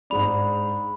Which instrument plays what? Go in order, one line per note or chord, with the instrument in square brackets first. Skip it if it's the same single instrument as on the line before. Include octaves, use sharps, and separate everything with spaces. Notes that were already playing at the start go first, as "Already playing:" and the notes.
[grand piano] G#2 G#3 D4 [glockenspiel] B5